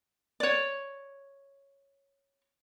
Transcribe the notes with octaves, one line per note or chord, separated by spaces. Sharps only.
C#5 D5